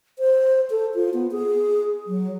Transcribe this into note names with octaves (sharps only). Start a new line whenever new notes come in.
C5
A4
F4
B3
G#4
F#3